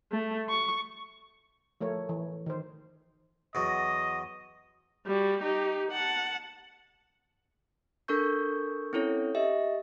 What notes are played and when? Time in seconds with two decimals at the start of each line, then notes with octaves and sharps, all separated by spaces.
0.12 A3
0.49 C#6
1.81 F3 A3 A#4 C#5
2.09 E3
2.46 D#3 C5
3.55 E2 F#3 D#5
5.06 G3 F#4
5.40 D#4 G4
5.91 F#5 A5
8.08 D4 A4 A#4 C#6 G6
8.93 C4 C#4 E4 A4 C#5
9.35 G4 D#5 E5